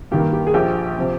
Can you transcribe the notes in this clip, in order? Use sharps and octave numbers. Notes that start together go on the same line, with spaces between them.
G2 D#3 A#3 G4
G4
G#4
A#1 A#2 F3 G4
C3 F3